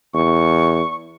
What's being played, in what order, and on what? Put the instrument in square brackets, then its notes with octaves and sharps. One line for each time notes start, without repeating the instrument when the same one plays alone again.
[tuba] E2 [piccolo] C#6